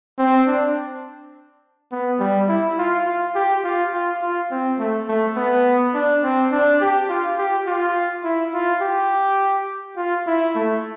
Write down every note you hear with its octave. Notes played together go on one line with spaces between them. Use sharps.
C4
D4
B3
G3
E4
F4
F4
G4
F4
F4
F4
C4
A3
A3
B3
D4
C4
D4
G4
F4
G4
F4
E4
F4
G4
F4
E4
A3